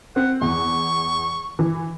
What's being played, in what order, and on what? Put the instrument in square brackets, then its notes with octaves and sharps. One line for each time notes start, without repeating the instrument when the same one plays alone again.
[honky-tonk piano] C4 [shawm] F#5
[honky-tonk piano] E2 [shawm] C#6
[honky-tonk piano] E3